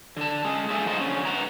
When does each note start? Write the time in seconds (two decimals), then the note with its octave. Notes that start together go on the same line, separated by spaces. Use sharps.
0.17 D3 A5
0.45 G#3 C#4 G#4
0.70 A3 A#3 D4 A4 E5 G#5
0.84 G#2 F3 A3 D#4 C5
1.00 D3 C#4
1.25 G#2 G#3 B4 F#5 A#5